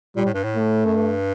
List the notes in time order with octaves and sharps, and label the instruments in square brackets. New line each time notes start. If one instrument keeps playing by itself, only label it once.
[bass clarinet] A#2 [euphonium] G3
[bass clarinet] A2
G2
A2
[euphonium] A3
[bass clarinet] F#2
G2